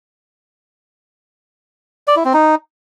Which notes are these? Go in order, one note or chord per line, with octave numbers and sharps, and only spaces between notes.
D5
E4
C4
D#4